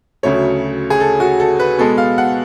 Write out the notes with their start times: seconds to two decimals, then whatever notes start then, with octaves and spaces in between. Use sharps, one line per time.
0.23 D2 C#3 F#3 A3 C#5
0.90 G#4
1.00 A4
1.20 F#4
1.40 A4
1.60 B4
1.78 B2 G#3 B3 A4
1.98 F5
2.18 F#5